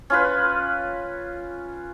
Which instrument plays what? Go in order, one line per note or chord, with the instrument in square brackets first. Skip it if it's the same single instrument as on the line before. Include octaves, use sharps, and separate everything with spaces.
[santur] C#4 F4 B4